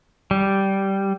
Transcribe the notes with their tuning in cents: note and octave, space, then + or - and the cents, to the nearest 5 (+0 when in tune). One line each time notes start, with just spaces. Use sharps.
G3 -10